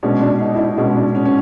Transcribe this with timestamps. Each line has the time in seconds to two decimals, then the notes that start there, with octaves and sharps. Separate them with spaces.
0.03 B2 G#3 C#4 D4
0.22 D4
0.41 D#4
0.55 E4
0.59 D#4
0.77 B2 G#3 C#4
0.97 D4
1.15 C#4
1.25 C#4